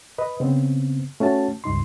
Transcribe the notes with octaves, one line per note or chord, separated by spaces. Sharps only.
B4 D#5
C#3 B3 C4
A3 C#4 F#4 A5
C#2 G2 D#4 C6